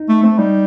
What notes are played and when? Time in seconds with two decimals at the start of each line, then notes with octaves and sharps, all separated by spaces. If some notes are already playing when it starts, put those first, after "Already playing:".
Already playing: D#4
0.09 A3
0.23 A3 C4
0.39 G3 D#4